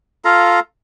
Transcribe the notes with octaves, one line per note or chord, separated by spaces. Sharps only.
F4 A4 F5 A#5